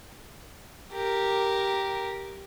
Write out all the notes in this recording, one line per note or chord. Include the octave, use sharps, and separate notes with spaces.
G4 A#4